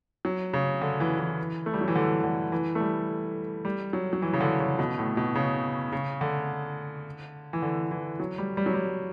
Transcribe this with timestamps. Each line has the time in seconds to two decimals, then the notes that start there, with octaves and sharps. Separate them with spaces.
0.25 F#3
0.53 C#3
0.82 D3
1.00 E3
1.19 E3
1.66 A3
1.74 G3
1.81 F#3
1.88 E3
1.95 D3
2.24 D3
2.52 E3
2.75 A3
2.80 G3
3.65 G3
3.93 F#3
4.13 F#3
4.22 E3
4.33 C#3
4.41 D3
4.59 C#3
4.79 B2
4.98 A2
5.17 B2
5.35 C#3
5.92 C#3
6.21 D3
7.53 E3
7.62 D3
7.91 E3
8.20 F#3
8.38 G3
8.57 G3
8.66 F#3
8.74 G3